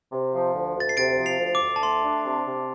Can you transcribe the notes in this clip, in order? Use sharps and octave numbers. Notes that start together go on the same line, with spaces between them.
C3
F3
D2
D2 A6
C7
C3 A6 D7
F3
C7 F7
D2
D6
D2
A5
A3 C6
D4
C3
C3